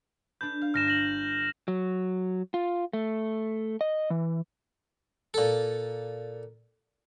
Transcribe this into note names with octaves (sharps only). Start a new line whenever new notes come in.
D4 A4 B4 G6
F5
G1 F6 A#6 E7
A#6 F#7
F#3
F4
A3
D#5
E3
A#2 A4